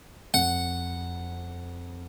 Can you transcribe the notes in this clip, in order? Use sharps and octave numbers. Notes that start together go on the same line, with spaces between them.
F2 F#5